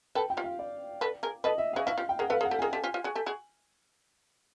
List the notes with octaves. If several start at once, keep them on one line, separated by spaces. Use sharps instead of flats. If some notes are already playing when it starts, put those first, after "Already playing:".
A4 B4 G5
G5
F4 G4
F5
D5
A4 B4
G#4 A#4
A4 B4 D#5
E5
F#4 G#4 F5
E4 F#4 F5
F4 G4
G5
G#4 A#4 F#5
A4 B4 F5
G#4 A#4
F#5
G4 A4
G#4 A#4 G#5
G4 A4
F4 G4
F4 G4
F#4 G#4
G4 A4
F#4 G#4